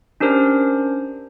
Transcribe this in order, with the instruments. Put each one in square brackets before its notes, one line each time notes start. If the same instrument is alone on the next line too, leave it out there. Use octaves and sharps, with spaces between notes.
[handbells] C#4 D4 G4 A#4 C5